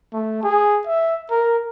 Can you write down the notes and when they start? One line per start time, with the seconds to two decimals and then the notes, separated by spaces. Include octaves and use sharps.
0.13 A3
0.43 G#4
0.87 E5
1.31 A#4